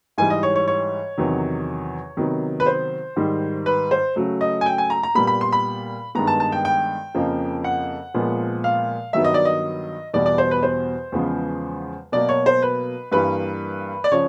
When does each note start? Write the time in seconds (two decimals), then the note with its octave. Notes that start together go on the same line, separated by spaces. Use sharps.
0.18 G#2 E3 G3 G#5
0.30 D#5
0.43 C#5
0.56 C#5
0.68 C#5
1.18 E2 C3 D#3 F#3
2.17 C3 D#3 F#3 B3
2.60 B4
2.66 C5
3.16 G#2 D#3 G3
3.66 B4
3.91 C5
4.16 C#3 F#3 A3
4.41 D#5
4.61 G#5
4.66 G5
4.78 G#5
4.90 A#5
5.03 A#5
5.15 A#2 G3 B3 B5
5.27 B5
5.41 C6
5.52 B5
6.15 G2 D#3 G#3 B3 A#5
6.27 A5
6.40 A5
6.52 G5
6.65 G5
7.15 F2 C#3 F3 A#3
7.64 F#5
8.14 A#2 F3 G#3 B3
8.64 F5
9.13 G2 D#3 F#3 B3 E5
9.24 D#5
9.34 D5
9.45 D#5
10.14 E2 B2 G3 B3 D5
10.26 D5
10.38 C5
10.51 B4
10.63 C5
11.12 E2 C#3 F3 G#3 B3
12.12 B2 F#3 A#3 D5
12.29 C#5
12.46 C5
12.62 B4
13.12 G2 E3 G3 A#3 B4
14.04 D5
14.12 C#3 F3 C#5